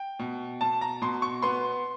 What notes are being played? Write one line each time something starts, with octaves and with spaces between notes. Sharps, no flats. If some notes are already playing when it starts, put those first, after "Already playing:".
Already playing: G5
B2
B2 A5
A#5
B2 C6
C#6
B3 C6